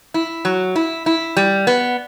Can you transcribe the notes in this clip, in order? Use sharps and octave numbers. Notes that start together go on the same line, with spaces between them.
E4
F#3
E4
E4
G3
B3